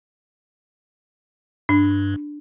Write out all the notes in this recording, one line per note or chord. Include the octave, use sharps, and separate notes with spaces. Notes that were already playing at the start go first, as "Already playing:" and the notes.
G2 D4